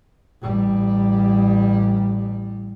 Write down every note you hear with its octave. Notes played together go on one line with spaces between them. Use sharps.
A1 G3